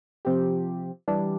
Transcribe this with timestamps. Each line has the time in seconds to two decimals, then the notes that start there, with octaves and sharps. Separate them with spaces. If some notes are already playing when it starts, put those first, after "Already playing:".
0.25 C3 F3 C4 G4
1.08 E3 G3 D4